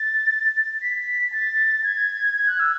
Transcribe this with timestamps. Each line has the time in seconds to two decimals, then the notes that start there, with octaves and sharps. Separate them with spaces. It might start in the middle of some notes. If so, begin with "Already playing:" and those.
Already playing: A6
0.82 B6
1.32 A6
1.84 G#6
2.36 G#6
2.48 F#6
2.60 E6